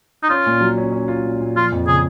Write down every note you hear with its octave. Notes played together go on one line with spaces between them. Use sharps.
D#4
C#4 F4
A#2
F#3
C#4
C#4
F4
A#2
A#2
F3 F4
F2
C#3 G#4